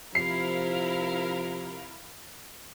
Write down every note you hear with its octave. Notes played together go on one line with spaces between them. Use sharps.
C3 F3 E4 A#4 F5 C7